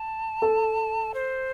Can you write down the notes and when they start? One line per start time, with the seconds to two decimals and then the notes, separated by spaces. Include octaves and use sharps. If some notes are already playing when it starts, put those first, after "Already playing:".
Already playing: A5
0.42 A4
1.14 C5